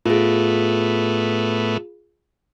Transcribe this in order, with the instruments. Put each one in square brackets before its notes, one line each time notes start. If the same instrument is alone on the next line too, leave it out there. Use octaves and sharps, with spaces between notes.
[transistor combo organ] A2 A3 B3 [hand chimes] F4 G#4